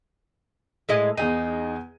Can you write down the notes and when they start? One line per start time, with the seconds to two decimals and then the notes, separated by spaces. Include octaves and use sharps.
0.89 A2 G#3 D#5
1.18 E2 D#4 G#4 D#7